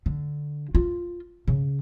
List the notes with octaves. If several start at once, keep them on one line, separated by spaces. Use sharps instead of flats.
D3
F4
C#3